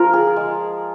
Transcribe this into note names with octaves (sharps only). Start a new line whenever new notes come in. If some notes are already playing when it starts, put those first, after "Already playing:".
Already playing: F3 F4 A#4
G#4
G#3